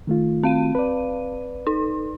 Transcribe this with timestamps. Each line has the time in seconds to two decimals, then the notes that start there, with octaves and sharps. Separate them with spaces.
0.07 D#3 A3 F4
0.43 C4 F5 D#7
0.75 B4 D5
1.67 D#4